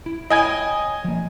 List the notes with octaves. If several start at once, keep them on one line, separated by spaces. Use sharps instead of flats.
E4
C#5 D#5 G5 G#5 B5 G#6
F3 A#3